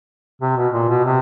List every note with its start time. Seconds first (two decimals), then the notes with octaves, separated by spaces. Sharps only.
0.42 C3
0.57 B2
0.73 A#2
0.89 B2
1.04 C3